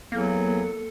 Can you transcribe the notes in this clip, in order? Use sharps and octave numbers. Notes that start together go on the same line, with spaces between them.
E2 F#3 A#3 A4